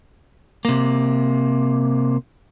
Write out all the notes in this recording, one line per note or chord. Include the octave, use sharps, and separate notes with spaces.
C3 A#3